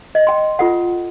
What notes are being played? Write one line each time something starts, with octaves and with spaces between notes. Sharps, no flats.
D#5
G5 C6
F4 A4 F#5